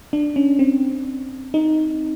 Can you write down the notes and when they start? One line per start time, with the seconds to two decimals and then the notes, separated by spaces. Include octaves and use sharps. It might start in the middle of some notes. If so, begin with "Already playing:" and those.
0.13 D4
0.36 C#4
0.59 C4
1.54 D#4